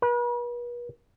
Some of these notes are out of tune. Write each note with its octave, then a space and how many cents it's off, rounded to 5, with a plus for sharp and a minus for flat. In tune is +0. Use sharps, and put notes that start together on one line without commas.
B4 -40